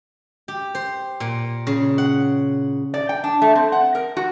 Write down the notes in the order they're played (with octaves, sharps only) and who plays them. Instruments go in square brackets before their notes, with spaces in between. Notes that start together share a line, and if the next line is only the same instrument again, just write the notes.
[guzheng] G4
C5
A#2
C#3
F#5
[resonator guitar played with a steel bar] D5
G5
D4
A3
C4
F#5
A#4
F#4